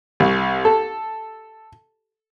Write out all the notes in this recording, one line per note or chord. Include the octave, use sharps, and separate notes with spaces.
C2
A4